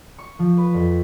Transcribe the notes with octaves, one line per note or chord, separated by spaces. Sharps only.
C#6
F3
B4
F2